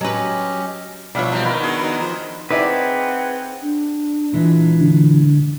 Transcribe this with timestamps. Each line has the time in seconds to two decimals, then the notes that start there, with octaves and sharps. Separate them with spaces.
0.01 F#3 C#4 G4 B4 D#5
1.15 B2 F3 G3 D4 E4 C#5 E5 F5
1.32 G3 C4 D#4 B4
1.45 D#3 B3 E4 A#4
1.63 B3 D4 F#4 G#4
1.84 D#4
2.00 F3 C5
2.51 C4 D#4 E4 G#4 B4 D5 F#5
3.62 D4
4.33 A#2 E3 G#3
4.81 D3